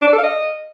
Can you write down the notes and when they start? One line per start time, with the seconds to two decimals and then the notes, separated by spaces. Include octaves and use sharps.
0.02 D4
0.07 D5
0.13 A4
0.18 F5
0.24 D#5